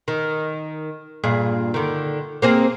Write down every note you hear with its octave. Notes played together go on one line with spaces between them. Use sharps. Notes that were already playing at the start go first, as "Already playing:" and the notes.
D#3
G2 A#2 G#4
D3 D#3
A#3 C4 G#4